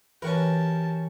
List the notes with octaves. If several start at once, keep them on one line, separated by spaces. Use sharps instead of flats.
E3 C#4 F#4 G4 A#4 B4 A5